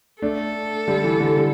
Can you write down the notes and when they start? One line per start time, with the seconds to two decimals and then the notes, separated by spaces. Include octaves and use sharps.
0.22 A3 D4 A4
0.87 D3 G3
1.04 E3
1.20 D3 G3
1.37 D3 G3